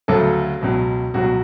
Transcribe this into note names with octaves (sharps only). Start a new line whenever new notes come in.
D2 C#3 F#3 A4
C#2 B2 F#3
C#2 B2 F#3 F#4